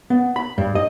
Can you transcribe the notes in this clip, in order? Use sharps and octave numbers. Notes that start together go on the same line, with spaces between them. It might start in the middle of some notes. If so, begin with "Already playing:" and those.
B3
B5
G2
D#5